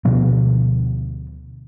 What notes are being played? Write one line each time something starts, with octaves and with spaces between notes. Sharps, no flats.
D2 B2 F3 B3